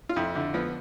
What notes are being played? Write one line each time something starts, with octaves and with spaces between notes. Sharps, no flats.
F4
F2 E4
D3 E4
F3 B3